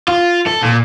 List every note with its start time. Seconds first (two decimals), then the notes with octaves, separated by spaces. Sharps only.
0.08 F4
0.46 A4
0.62 A#2